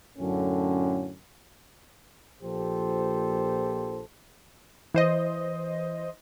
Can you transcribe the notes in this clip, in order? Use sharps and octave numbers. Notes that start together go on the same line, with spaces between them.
F#2 A2 D3 C#4
A#1 A#2 F3 G4 A4 C5
E3 C5 D#5